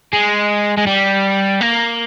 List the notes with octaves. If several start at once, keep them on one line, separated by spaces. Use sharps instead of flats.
G#3
G#3
G3
A#3